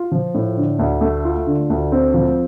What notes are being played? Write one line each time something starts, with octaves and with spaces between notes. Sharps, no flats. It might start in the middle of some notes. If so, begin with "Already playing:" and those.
Already playing: F4
F3
A2
D3
D2
A3
F4
D3
D2
C4
F3